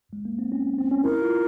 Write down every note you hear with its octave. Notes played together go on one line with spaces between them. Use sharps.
G#3
A#3
C4
C#4
C4
C#4
E4 A#4
F4